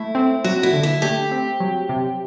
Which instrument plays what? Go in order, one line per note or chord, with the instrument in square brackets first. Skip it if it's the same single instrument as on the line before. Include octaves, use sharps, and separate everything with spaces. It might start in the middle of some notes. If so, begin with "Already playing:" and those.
Already playing: [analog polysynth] A3 [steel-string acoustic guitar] E4
[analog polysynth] C4
[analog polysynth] F#3 [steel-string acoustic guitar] F#4
[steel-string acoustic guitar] E4
[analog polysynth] D3
[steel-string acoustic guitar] E4
[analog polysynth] A3 [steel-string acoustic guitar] G4
[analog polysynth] C4
F#3
C3